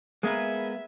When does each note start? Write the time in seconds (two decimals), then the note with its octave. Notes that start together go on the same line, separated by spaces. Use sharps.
0.23 G#3 A#3 B3 G#4 A#4 B4 E5